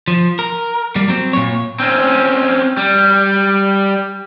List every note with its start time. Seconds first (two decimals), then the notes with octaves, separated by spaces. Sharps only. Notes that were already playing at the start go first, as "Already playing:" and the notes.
0.08 F3
0.39 A#4
0.96 G3 A#3
1.08 F#3 C4
1.33 A#2 C#5
1.80 C4 C#4
2.77 G3